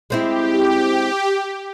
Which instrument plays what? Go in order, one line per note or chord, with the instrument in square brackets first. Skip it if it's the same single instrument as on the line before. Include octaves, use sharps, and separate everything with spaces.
[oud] G#3 C4 E4 [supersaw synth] G4